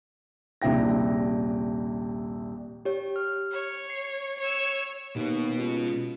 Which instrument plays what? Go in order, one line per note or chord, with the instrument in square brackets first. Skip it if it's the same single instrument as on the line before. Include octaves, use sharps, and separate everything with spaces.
[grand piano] D#1 A#1 C3 E4 G5 A#6
[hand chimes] G4 C#5
F6
[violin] C#5
[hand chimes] C7
[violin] C#5 E6
[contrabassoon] D#2 [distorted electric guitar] B2 B3
[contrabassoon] C#2